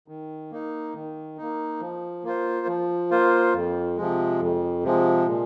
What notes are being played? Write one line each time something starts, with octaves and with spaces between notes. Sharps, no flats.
D#3
A#3 D#4
D#3
A#3 D#4
F3
A#3 F4 C5
F3
A#3 F4 C5
F2
C3 F3 G#3
F2
C3 F3 G#3
A#2